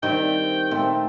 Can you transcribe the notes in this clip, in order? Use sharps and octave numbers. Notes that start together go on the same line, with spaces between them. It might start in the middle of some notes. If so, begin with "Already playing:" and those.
D#3 G3 C4 E5 G5
A#2 A3 C4